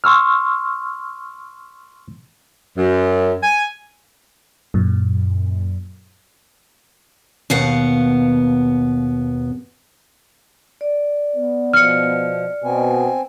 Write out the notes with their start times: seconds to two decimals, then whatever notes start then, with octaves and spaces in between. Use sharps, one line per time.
0.04 C6 C#6 E6 F6
2.78 F#2
3.43 G#5
4.74 F#2 A#2
7.50 D#2 B2 B3 F5 F#5
10.81 D5
11.36 B3
11.73 B2 F3 F6 C#7
12.64 B2 C4 G#5